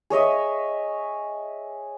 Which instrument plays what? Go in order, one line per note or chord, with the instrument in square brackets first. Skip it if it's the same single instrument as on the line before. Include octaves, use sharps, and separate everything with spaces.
[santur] G#4 C#5 D#5 E5